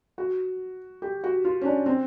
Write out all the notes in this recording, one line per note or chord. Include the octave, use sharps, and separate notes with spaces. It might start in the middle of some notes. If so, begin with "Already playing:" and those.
F#4
G4
F#4
F4
C#4
D4
C4